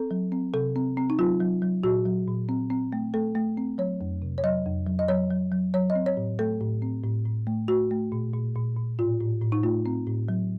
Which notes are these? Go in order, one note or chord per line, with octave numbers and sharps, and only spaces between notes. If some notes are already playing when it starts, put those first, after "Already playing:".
Already playing: C4 A4
F#3
C4
C3 A4
C4
C4
D#4
F#3 F4
F#3
F#3
A#2 F#4
F#3
A#2
C4
C4
A3
A3 A4
A3
C4
F#3 C#5
F2
C3
C#5
F#3 D#5
F2
F#3
D#5
F#3 C#5
F#3
F#3
F#3 C#5
D#5
C4
C#5
A2
A3 A4
A2
C4
A2
A2
A3
A3 F#4
A3
A#2
A#2
A#2
A#2
A2 F4
A2
A2
D#4
A3 F4
C4
A2
F#3